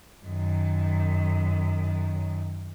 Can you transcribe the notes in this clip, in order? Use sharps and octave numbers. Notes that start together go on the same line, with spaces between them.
F#2 D#3